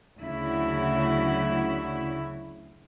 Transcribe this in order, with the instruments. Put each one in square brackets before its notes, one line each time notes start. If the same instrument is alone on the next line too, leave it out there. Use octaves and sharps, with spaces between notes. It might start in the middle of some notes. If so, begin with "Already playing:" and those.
[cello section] D2 C#3 F#3 E4